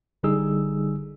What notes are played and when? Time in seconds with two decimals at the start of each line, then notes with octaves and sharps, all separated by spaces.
0.23 G1 D3 G3 D#4 G#4 E6